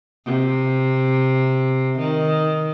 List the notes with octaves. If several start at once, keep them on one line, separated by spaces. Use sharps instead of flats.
C3
D#3